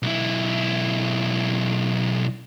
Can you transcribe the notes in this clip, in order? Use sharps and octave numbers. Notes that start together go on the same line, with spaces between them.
B1 E4